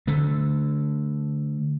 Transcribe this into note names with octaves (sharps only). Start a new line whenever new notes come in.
D3 A3